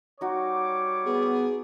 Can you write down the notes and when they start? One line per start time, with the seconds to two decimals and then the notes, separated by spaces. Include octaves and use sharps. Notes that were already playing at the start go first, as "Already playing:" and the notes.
0.21 G3 D#4 F#4 C#5 D6
1.05 B3 G#4